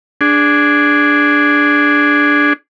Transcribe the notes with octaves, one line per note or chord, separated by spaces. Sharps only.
D4 G#4